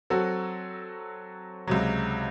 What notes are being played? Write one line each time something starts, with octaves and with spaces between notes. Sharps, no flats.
F#3 C4 F#4 A4
C#2 C3 F#3